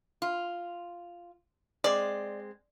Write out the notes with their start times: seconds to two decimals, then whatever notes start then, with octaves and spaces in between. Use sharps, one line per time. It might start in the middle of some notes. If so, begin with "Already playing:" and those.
0.22 F4
1.84 G#3 C4 D5